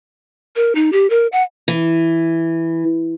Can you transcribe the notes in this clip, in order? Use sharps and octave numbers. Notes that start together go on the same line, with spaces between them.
A#4
D#4
G4
A#4
F#5
E3